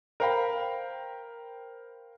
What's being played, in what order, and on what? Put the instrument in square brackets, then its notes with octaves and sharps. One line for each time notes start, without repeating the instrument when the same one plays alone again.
[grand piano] A#4 C5 F5 G5 B5